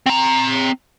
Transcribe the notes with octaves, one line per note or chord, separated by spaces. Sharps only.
C4 A#5